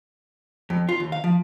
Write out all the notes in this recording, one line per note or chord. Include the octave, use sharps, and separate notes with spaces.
F2
F4
D#2
F5
F3